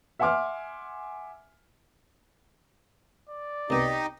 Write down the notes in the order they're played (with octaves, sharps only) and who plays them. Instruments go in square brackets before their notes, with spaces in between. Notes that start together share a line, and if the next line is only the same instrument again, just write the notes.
[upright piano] E5 F#5 G#5 C6 D6 F6
[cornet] D5
[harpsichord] C2 B2 [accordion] D#4 G4 D#5